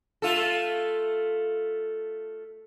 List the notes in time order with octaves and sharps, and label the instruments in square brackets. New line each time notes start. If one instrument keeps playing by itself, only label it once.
[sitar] A3 F4 A4